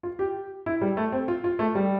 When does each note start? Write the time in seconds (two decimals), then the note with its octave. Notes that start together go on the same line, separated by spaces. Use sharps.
0.03 F4
0.19 G4
0.66 E4
0.81 G3
0.97 A3
1.12 C4
1.28 F4
1.44 F4
1.59 A3
1.75 G3